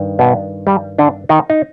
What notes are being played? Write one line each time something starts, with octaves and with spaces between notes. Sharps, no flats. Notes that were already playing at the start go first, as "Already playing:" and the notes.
Already playing: G2 D#3
B2 B3
G3
D3 D4
D#3 D#4
D#4